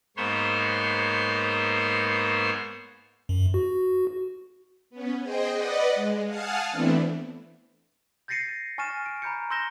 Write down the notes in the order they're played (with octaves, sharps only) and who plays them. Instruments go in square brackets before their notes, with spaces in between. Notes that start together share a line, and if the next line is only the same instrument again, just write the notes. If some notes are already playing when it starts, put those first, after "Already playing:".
[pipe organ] G#2 A#3 B3 C5 C#5 C6
[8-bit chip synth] F#2
F#4
[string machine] B3 C#4
G#4 C5 D#5 G5
B4 D5 D#5 F#5
G#3
F5 F#5 G#5 A5 D#6 F6
E3 A3 B3 C4 D4 E4
[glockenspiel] G6 A6 A#6 C7 C#7 D#7
G#5 C#6 F6 A6 D#7 E7
D7
A#5 B5 G6 C#7
C6 E6 G6 A#6 E7 G7